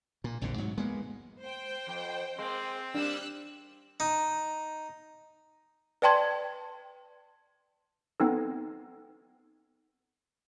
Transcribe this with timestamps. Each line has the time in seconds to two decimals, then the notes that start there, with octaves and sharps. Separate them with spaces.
0.24 A#2
0.42 A#1 F2 A2 D3
0.58 G#2 F#3
0.78 G#3 A#3 B3
1.42 C5 G5
1.87 F2
2.39 G#3 A#3 C4 C6
2.95 G3 A#3 D4 E6 F#6
4.00 D#4
6.02 B4 D5 G5 A5 C6 G#6
8.20 B3 C4 D#4 A4